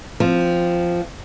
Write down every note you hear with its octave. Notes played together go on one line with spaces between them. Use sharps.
F3 C4